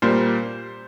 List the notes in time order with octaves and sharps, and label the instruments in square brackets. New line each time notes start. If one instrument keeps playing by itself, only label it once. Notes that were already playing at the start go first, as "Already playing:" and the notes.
[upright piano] A#2 G3 A#3 C5